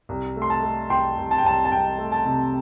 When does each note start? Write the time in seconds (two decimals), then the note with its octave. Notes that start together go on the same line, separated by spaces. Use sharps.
0.09 C2
0.36 A3
0.42 C6
0.50 A5
0.63 A3
0.90 C2 G5 C6
1.18 C2
1.31 A5
1.38 G5
1.44 C2 A5
1.65 A5
1.72 C2 G5
1.98 A3
2.12 A5
2.25 C3